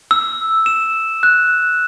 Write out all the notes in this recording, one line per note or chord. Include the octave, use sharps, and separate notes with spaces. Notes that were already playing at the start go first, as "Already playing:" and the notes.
E6
E7
F#6